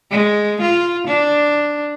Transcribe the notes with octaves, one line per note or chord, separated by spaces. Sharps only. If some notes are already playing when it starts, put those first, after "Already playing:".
G#3
F4
D4